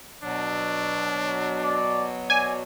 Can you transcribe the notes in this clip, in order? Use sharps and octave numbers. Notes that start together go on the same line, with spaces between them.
B2 F#3 D4
D5
D5 G#5